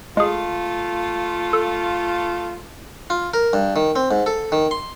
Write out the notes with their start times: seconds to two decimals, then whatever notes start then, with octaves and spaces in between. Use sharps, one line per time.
0.17 G#3 A3 F4 G#4
1.53 A4
3.10 F4
3.34 A#4
3.53 G2
3.76 D#3
3.96 C4
4.11 G#2
4.26 A4
4.52 D#3
4.71 C6